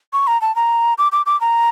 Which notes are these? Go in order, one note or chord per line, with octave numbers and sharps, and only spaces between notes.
C#6
A#5
A5
A#5
D6
D6
D6
A#5